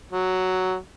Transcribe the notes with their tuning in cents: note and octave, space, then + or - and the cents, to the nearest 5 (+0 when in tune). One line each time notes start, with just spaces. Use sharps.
F#3 +5